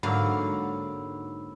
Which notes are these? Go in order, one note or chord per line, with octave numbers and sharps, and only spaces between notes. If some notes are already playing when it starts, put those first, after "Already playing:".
G#2 D3 F#3 A#3 F#4 F5 B5 E6